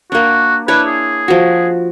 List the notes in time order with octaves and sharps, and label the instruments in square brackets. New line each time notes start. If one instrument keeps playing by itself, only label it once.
[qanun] A#3 D4 [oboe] F#4
[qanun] D4 E4 C#5 [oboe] B4
[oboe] G#4
[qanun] F3 F#4